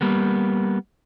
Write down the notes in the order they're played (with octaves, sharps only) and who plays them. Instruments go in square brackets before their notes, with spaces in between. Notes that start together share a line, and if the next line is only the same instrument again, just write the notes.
[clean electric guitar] G3 A#3 B3